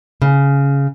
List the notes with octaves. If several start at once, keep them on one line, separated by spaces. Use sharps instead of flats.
C#3